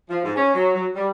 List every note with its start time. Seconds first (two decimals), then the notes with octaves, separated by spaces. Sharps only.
0.10 F3
0.23 G#2
0.36 C#4
0.54 F#3
0.74 F#3
0.95 G3